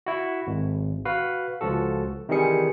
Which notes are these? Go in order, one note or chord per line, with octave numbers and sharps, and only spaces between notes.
E4 F#4
G#1
F#4 B4 F5
C#2 F3 F#4 A4
C3 D#3 E3 G3 G#4 C#7